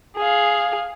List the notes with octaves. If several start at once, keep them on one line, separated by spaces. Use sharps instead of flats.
G#4 F5